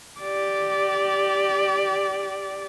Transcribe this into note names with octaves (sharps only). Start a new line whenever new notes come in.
G4 D5